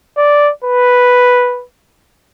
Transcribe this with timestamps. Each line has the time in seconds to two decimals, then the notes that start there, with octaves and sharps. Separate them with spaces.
0.18 D5
0.64 B4